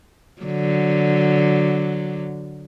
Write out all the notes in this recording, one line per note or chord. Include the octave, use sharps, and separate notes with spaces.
D3 F#3